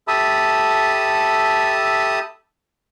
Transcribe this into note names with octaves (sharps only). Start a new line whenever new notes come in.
G4 A4 E5 A5 B5 D#6